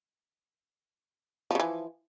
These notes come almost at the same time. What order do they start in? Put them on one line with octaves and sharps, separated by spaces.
F3 C#3 E3